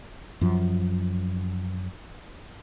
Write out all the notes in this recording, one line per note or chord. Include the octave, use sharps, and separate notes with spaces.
F#2 F3